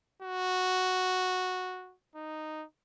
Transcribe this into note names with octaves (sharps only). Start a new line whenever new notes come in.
F#4
D#4